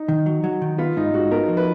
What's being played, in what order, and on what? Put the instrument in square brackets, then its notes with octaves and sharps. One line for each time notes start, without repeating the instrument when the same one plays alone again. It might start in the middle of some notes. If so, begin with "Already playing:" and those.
Already playing: [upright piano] D#4
[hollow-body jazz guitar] D#3
F#3
F#3
D#3
[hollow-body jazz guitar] B3 [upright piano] F4
[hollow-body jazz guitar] G#2 [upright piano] D#4
[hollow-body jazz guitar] G#2 [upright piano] F#4
[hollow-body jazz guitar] B3 [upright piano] A#4
[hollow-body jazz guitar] F3
[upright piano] B4